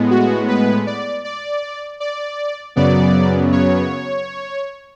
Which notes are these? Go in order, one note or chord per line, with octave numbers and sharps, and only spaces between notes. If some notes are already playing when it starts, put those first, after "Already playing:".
Already playing: A2 G#3 B3
F#4
B4
D5
D5
D5
F#2 C#3 F#3 B3 D5
C#5